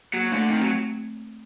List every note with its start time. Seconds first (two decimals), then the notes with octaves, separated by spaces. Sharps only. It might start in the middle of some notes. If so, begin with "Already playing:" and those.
0.13 F#3 A#3
0.31 D3 A3
0.49 D#3 C4
0.61 F#3